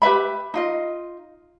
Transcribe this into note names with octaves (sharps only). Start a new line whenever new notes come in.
G4 B4 E5 B5
D#4 F4 D#5